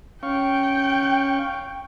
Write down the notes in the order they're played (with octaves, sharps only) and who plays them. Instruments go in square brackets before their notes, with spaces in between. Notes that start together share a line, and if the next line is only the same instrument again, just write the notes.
[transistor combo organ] C#4 F5 C#6 [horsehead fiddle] G5